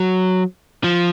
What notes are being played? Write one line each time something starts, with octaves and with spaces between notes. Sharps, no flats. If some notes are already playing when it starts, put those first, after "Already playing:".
Already playing: F#3
F3